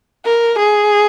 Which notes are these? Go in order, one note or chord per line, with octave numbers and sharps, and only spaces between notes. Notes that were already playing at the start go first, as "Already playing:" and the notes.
A#4
G#4